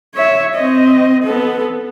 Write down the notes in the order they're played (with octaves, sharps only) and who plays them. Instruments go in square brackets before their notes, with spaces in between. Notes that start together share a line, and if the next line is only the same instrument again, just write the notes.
[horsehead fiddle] C#5 E5
C4 D#5
B3 A4